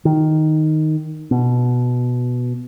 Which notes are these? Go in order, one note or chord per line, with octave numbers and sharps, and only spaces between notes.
D#3
B2